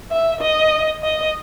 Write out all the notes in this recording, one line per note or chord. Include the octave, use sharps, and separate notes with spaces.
E5
D#5
D#5